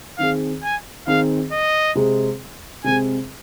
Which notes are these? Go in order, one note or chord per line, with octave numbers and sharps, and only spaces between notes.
D#3 C4 G#4 F5
G#5
D#3 C4 G#4 F5
D#5
C3 G#3 C4 G#4
C3 G#3 C4 G#4 G#5